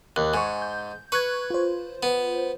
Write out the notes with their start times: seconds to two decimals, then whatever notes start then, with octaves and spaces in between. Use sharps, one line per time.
0.16 D#2 F#6
0.34 G#2 G#5 C#6
0.62 G6
1.12 B4 C#6 F#6 G#6
1.50 F4 C5
2.03 B3